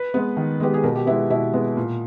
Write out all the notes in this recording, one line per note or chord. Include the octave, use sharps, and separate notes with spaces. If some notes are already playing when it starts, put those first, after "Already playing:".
Already playing: B4
G#3 B3
D#3
G#3 B3 G4
G#4
B2 A#4
G4
G#3 B3 E4
B2 E4
G#3 B3
A#2